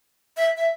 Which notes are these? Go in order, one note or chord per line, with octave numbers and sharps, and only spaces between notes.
E5
E5